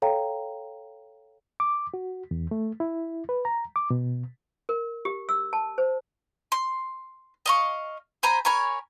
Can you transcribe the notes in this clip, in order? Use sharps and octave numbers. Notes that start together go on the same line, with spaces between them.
A4 C#5 F5 G5 A#5
D6
F#4
E2
A3
E4
B4
A#5
D6
B2
A#4
G4
E6
A5
C5
C6
D#5 F5 C#6
C5 G#5 A#5 B5
A#4 C#5 G#5 B5